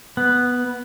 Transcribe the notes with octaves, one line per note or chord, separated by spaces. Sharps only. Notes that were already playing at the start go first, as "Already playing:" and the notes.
B3